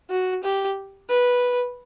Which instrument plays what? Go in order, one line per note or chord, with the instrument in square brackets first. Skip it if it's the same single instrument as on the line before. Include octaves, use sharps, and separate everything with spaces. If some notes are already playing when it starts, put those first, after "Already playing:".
[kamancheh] F#4
G4
B4